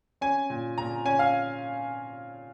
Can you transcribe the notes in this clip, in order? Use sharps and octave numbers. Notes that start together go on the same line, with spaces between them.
C#4 G#5
A#2
A#2 A#5
C#4 G#5
F5